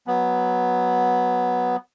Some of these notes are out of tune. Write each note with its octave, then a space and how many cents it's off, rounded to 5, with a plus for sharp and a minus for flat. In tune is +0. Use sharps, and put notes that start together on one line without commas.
F#3 +0 B3 +0